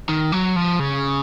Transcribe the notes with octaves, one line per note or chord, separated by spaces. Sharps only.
D#3
F#3
F3
C#3